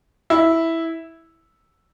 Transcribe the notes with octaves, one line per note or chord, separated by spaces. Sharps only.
E4